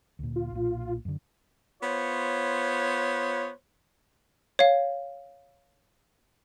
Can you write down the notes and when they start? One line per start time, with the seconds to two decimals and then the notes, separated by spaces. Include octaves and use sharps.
0.19 D2 A#2
0.36 F4
0.51 B1 A#2
1.05 F#2 D3
1.83 B3 F4 C5 C#5
4.59 C#5 F5